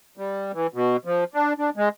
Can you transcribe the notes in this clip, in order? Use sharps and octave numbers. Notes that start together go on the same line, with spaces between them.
G3
E3
B2
F3
D4
D4
G#3